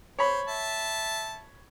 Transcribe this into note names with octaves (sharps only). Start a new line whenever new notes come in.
C5 C#5 B5
E5 A5